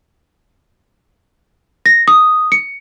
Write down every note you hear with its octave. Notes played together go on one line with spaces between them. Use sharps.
A#6
D#6
C#7